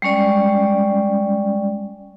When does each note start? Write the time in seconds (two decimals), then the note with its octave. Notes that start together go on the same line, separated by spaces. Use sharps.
0.02 G3 G#3 C#4 D5